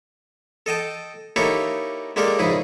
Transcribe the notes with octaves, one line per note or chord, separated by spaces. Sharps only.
A4 D#5 G5 A5
A#3 D#4 E4 G4 A4 C#5
G#3 A#3 D4 G4 A4 A#4
A#1 G#2 C#3 E4 G#4